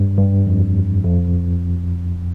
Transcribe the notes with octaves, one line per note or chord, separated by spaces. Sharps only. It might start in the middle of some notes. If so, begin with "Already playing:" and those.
Already playing: G2
G2
F2
F2